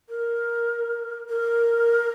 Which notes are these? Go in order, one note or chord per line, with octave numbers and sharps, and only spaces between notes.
A#4
A#4